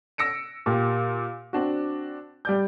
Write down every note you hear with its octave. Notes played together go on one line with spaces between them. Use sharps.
E6 A#6 C#7 D7
A#2 A#3 G4
C4 D4 F#4
G3 D5 G6